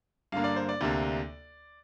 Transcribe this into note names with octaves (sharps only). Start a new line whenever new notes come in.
G2 D3 A#3 F5
D5
C5
D5
D2 C3 A#3 D4